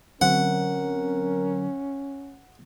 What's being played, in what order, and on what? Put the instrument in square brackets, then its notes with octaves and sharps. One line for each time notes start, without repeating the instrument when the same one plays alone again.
[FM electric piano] D3 F#3 C4 [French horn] C#4 [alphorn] A#4 [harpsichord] F#5